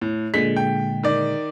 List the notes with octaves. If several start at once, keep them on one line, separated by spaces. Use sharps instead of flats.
A2
A#2 D3 G#3 B6
G5
D#3 D5